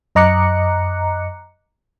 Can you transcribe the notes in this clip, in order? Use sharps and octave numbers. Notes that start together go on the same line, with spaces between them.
F#2 D#5 A#5 D6 F#6 C#7